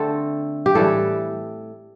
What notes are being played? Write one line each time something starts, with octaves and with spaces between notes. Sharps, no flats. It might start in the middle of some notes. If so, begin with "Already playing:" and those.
Already playing: D3 A3 C4 A4
G4
A2 E3 G3 A4